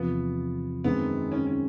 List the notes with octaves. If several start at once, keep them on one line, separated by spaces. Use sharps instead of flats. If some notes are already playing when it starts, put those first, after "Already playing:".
Already playing: E2 C3 F3 B3
F#2 D#3 G#3 B3 C4
C#4
C#4